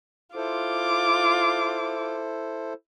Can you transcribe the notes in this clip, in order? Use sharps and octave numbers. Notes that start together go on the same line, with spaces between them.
E4 F4 A4 C5 D6